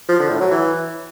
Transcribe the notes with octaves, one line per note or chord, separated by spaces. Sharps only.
F3
D3
A2
F#3
E3